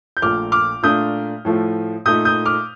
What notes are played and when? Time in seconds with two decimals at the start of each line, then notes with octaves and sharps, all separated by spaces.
0.17 G6
0.22 A#1 A#2 A3 D6 F6
0.52 D6 F6
0.82 A#2 A3 D4 F4 D#6 G6
1.45 A2 F3 A3
2.05 A#2 A3 D#4 D#6 G6
2.25 D#6 G6
2.45 D6 F6